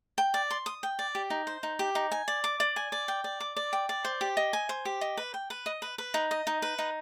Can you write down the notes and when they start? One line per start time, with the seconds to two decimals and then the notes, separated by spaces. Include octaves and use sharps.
0.18 G5
0.34 D5
0.50 C6
0.66 D#6
0.83 G5
0.99 D5
1.15 G4
1.30 D#4
1.47 C5
1.63 D#4
1.79 G4
1.95 D#4
2.12 G#5
2.28 D5
2.44 D6
2.60 D5
2.76 G#5
2.92 D5
3.08 G5
3.24 D5
3.40 D6
3.56 D5
3.73 G5
3.89 D5
4.05 C5
4.21 G4
4.37 D#5
4.53 G#5
4.69 C5
4.85 G4
5.01 D#5
5.17 B4
5.34 G5
5.50 B4
5.66 D#5
5.82 B4
5.98 B4
6.14 D#4
6.31 D#5
6.47 D#4
6.62 B4
6.79 D#4